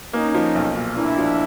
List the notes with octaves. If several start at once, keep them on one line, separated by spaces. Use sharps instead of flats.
A#3 C#4 D#4
F3
B1
A#2
A#3 D4 E4
F3